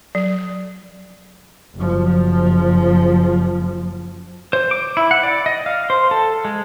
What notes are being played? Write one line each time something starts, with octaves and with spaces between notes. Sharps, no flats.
F#3
F#1 F3
C5
D6
E4
F#5
D5
D#5
F5
C5
A4
G#3